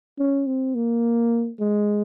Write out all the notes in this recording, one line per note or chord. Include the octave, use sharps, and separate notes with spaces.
C#4
C4
A#3
G#3